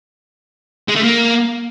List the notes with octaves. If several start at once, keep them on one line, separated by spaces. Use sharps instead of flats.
G#3
A3
A#3